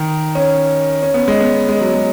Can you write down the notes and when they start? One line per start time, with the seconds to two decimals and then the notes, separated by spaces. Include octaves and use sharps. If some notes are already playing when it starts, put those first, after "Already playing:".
Already playing: D#3
0.35 C#4
1.02 C#4
1.14 B3
1.28 G#3
1.41 B3
1.69 G#3
1.81 F#3
1.95 G#3